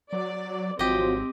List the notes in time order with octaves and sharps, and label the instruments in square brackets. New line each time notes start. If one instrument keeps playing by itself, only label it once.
[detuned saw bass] F#3 [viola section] D5
[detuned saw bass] G#1 [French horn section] F3 F#3 F#4 [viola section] C4 [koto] G4 D#5